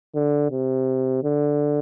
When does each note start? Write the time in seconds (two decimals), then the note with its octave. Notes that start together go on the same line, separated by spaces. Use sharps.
0.15 D3
0.51 C3
1.23 D3